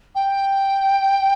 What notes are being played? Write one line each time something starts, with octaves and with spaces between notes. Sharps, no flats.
G5